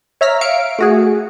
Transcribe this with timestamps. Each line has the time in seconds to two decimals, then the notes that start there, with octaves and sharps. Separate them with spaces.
0.21 C#5 E5 A#5 F6 B6
0.41 E5 F5 C#7 D7
0.79 A3 F#4 G#4